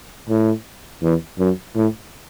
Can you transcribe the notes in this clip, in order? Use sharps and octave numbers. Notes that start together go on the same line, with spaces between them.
A2
E2
F#2
A2